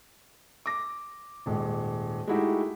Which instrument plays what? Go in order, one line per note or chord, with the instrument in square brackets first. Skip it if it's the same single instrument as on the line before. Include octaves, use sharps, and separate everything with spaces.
[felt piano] D6 A#6
D#1 G#2
G#3 A3 D#4 E4 F#4 G4